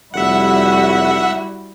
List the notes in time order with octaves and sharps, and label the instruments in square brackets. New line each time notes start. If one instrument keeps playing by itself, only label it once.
[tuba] F1 [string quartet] G3 E4 F#4 [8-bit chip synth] E5 F#5